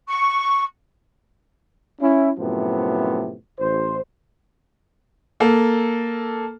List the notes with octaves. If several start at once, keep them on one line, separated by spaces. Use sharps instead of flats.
C#6
C#4 E4
F#2 A2 C3 F3 B3
A1 C5
A#3 A4